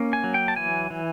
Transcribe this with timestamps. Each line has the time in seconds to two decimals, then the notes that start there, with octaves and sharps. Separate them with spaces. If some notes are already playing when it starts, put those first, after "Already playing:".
Already playing: A#3 C#4
0.13 G#5
0.24 F#3
0.34 G5
0.48 A5
0.56 E3 G#5
0.90 E3